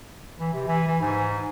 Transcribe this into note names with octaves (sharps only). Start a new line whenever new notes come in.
E3
C3
E3 G#5
E3
G#2